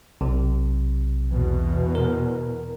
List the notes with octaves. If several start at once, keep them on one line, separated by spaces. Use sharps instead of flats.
B1 C3
E2 B2
A#4